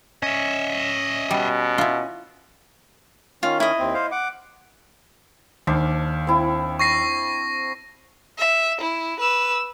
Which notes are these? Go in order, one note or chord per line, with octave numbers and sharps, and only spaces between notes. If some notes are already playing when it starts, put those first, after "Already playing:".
C#4 D#5 E5
B2 G3
E4 F4
D#3 C#4 F4
E4 D#5
D#2 C4
C5 F5
F#5 D6
D#2 D4 C5 F5
C4 E4
C#6 A#6 C7
E5
E4
B4 E6